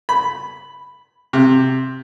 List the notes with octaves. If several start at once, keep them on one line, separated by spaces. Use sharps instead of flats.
B5
C3